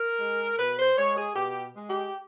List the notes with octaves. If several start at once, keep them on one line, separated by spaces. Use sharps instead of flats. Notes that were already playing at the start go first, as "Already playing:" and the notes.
Already playing: A#4
G#3
B2 B4
C5
G#3 C#5
G#4
B2 G4
G#3
G4